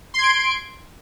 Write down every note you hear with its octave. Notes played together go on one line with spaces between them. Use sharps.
C6 G#6 D7